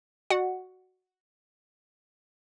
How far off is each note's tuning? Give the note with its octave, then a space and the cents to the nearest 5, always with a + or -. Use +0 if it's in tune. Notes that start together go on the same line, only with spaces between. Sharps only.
F#4 +0 D5 +40 F#5 +0